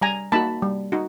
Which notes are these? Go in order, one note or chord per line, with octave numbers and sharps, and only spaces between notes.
G3 G#5 A#5
A#3 D#4 F#4 A5 B5
G3
D#4 F#4